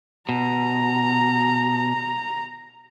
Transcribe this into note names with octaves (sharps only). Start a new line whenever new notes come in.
B2 A#5